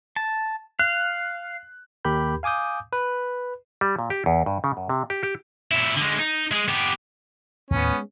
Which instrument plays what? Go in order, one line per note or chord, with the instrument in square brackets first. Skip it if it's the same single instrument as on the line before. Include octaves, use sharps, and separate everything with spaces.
[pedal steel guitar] A5
[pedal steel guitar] F5 [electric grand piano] F#6
[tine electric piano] D#2 G4 A#4 B5 G6
F5 G#5 D6 D#6 G6
B4
[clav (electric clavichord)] G3
A#2
G4
E2
G2
C#3
F#2
C3
G4
G4
[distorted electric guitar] A#2 E4
D3 G#3
D#4
G#3 G#4
B3 G4
[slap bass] D#2 A2 [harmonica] B3 C#4
[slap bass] G#3